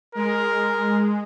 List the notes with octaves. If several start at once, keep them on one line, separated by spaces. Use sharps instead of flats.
G#3 A#4